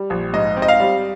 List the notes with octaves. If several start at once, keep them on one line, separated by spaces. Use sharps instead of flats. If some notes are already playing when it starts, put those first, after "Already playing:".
Already playing: G3
A#1
G#2 D#5
C4
D#5
F5
G3